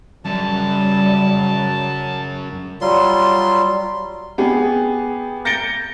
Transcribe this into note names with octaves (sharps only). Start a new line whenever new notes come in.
F#2 C#3 F#3 G3 A5
F#3 G3 F4 C6
B3 G4 G#4
G6 A6 A#6 C#7 D7 G7